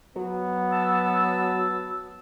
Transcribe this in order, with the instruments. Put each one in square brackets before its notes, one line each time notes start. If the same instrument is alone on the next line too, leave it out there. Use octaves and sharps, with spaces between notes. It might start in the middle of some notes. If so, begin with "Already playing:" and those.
[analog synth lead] F#3 [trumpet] B3
[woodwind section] A5 E6